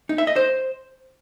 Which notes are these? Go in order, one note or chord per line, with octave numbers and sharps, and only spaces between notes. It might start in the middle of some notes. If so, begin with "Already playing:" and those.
D#4
E5
D#5
C5